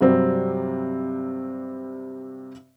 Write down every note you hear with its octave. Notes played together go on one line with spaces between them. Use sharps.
G2 C3 F#3 G3 C4